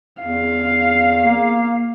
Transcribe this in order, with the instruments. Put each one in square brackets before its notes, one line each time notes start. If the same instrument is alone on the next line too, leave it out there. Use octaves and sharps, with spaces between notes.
[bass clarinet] E2 [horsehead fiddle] F5
[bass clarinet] A#3